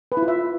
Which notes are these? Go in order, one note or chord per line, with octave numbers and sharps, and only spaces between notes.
B4
E4
F4
E5